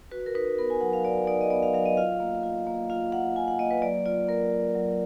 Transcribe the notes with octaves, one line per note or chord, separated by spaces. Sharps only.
F#4 B4
A#4
D#4 B4
B3 A#4
G#5
F#3 F#5
F5
F#4 D5
D#4 D5
D#5
B3 D5
F5
F#3 F5
D#5
F4 F5
A#3
F4
A#3
F4 F5
A#3 F#5
F4 G#5
F#5
A#3 D#5
B4
F#3 D5
F4 D5
A#3 A#4
F#3
F#3